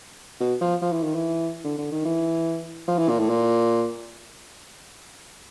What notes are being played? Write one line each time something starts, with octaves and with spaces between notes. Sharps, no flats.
B2
F3
F3
E3
D#3
E3
D3
D3
D#3
E3
F3
E3
A#2
A2
A#2